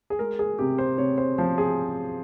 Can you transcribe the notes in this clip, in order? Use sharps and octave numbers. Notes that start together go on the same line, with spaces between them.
G#4
G#3 A#4
G#4
C3 G4
C5
C3 C#5
C5
F3 C5
G#4